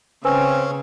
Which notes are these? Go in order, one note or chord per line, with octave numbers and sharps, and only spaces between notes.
C#3 C4 C#4 B4 G#5 E6